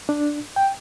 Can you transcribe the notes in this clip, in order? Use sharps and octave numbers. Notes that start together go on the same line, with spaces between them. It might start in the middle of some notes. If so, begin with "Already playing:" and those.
D4
G5